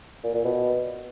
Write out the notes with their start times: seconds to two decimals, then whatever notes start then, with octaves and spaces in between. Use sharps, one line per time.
0.24 A#2
0.34 A#2
0.45 B2